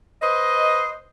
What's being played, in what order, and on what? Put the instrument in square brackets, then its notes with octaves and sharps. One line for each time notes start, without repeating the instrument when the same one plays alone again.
[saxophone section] B4 C5 D#5